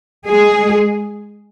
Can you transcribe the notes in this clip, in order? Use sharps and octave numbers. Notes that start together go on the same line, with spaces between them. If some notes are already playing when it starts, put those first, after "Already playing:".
G#3 G#4